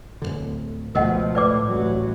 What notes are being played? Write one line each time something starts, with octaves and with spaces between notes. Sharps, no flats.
D1 B1 D3
C#2 B2 F3 A3 A#4 D#5 F#5
A2 B4 D5 D6
A1 F#3